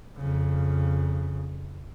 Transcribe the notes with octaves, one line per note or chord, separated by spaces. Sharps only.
F2 C#3